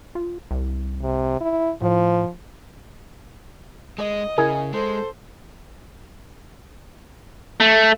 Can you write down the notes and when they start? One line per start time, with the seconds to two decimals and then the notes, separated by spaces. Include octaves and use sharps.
0.15 F4
0.51 C2
1.02 C3
1.41 E4
1.82 A2 F3
3.98 G#3 D#5
4.38 C#3 E4 G#4 A#4
4.73 G#3 A4 C5
7.60 A3